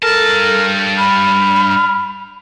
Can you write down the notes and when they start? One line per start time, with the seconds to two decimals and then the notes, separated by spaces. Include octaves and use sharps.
0.03 G2 A4 A#4 A5
0.98 B5 F6